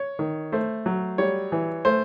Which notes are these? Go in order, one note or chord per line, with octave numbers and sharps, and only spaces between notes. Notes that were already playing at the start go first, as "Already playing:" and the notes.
Already playing: C#5
D#3
A3 C5
F#3
G3 C#5
E3
A3 C5